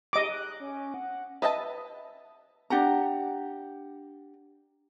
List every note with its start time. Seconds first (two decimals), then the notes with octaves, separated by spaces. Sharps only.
0.13 G4 D#5 D6
0.30 F#6
0.60 C#4
0.94 F#5
1.42 B4 D#5 E5 G5 A5
2.70 D4 G4 F#5 A#5